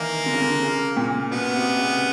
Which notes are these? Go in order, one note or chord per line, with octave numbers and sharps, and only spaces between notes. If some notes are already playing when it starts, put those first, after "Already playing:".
Already playing: D#3 E3 A#3
D3
C#3
D3
C#3
A#2
B2 B3
C3
C#3